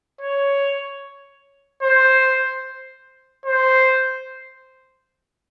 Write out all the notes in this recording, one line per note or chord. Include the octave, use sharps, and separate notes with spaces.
C#5
C5
C5